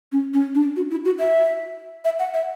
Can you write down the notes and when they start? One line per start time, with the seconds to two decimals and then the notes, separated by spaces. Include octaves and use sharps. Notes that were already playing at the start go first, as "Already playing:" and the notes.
0.12 C#4
0.34 C#4
0.55 D4
0.76 F#4
0.91 E4
1.05 F#4
1.19 E5
2.05 E5
2.19 F#5
2.34 E5